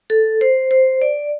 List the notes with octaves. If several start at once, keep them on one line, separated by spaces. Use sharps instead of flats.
A4
C5
C5
D5